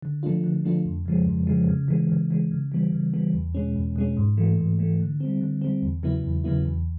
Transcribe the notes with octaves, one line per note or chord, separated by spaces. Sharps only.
D3
F3 A3 D4 F4
D3
F3 A3 D4 F4
F2
C#3 F3 G#3
F2
C#3 F3 G#3
C#3
E3 G#3
C#3
E3 G#3
C#3
E3 G3 B3
C#3
E3 G3 B3
E2
B2 G#3 C#4
E2
B2 G#3 C#4
G#2
E3 A3
G#2
E3 A3
D3
G3 C4
D3
G3 C4
E2
C#3 F#3 B3 E4
E2
C#3 F#3 B3 E4
E2